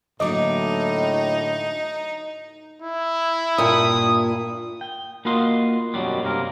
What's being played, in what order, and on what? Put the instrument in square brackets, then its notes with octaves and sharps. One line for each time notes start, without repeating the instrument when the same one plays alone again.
[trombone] A2 [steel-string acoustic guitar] D3 F#3 A#3 [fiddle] D#4 [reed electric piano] D#5 D6
[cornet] E4
[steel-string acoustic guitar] G2 A#2 [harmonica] D#6
[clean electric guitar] G5
A#3 F4 F#4 B4 D#5 C6
F#2 B2 E3 F#3 G3
G2 C3 A#3 C4 A#4